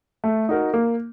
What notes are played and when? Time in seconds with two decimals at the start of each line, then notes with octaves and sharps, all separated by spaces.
0.24 A3
0.49 D#4 F#4 A#4
0.74 A#3